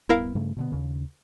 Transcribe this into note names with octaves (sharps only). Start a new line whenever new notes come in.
D1 G2 B3 E4 A#4 F5
G2 C#3 A3
B2 D3 B3
D#2 C#3